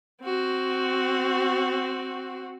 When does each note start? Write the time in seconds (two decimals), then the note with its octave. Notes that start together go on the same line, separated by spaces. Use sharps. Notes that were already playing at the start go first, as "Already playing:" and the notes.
0.22 C4 F#4